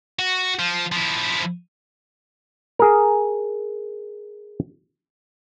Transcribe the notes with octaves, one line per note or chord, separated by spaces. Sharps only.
F#4
F3
F3 E4
G#4 A#4